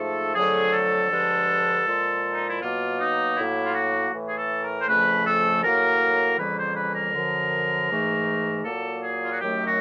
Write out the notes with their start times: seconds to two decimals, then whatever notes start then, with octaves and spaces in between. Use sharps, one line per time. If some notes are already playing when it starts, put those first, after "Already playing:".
Already playing: G#2 F3 A3 A4
0.34 F2 D3 F#3 A3 G#4
0.72 A4
1.10 G2 D3 F3 G#3
1.85 A#2 F3 G#3
2.34 D#4
2.48 E4
2.61 B2 F#3 A#3 F4
2.99 D#4
3.37 A2 F#3 A#3 E4
3.65 F4
3.74 F#4
4.12 A2 E3 A3
4.28 G#4
4.38 A4
4.62 A#4
4.80 C5
4.87 F2 C#3 F3 A3 B4
5.25 A4
5.63 A2 F#3 A#3 A#4
6.38 F2 C#3 E3 G3 A#3 B4
6.58 C5
6.76 B4
6.95 A#4
7.14 F#2 D3 F3
7.90 G#2 E3 A3
8.65 A#2 F#3 A#3 A4
9.03 G#4
9.24 F4
9.32 F#4
9.40 F#2 D#3 F#3 A3 G4
9.66 F#4